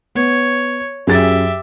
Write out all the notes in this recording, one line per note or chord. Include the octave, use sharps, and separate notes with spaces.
B3 C#5
F#2 G4 G#4 E5 A6